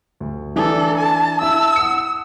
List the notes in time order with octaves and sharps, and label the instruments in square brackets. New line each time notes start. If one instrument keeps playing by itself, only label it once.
[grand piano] D2
[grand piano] E3 D4 [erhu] A4
[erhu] A5
[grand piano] E4 A5 [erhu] E6
[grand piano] F#5 D#6 C#7